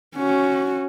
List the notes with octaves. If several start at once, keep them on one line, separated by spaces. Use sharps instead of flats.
C#4 F#4